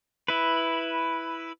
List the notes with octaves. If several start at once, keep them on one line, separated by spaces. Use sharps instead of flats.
E4 B4